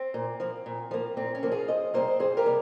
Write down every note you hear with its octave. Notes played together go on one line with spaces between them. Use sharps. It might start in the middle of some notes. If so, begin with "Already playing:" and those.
Already playing: C4
A#2
F3 A#3
A#2
F3 A#3
A#2 C4
C#4
F3 A#3
F4 G#4
F2 C5 D#5
C3 G3 A#3 C5 D#5
F2 G#4 C5
G4 A#4
C3 G3 A#3